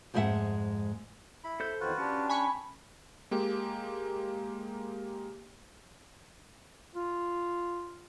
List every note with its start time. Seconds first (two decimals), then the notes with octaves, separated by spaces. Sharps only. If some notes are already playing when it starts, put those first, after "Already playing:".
0.14 F2 G#2 G#3 C#4 E5 F#5
1.44 E4 B5
1.60 A4 C5 G6
1.80 E2 D#3 C4 F4 F#4 B4
1.98 C#4 D4 G4
2.30 G#5 B5 C#6
3.31 G#3 A#3 G4
6.95 F4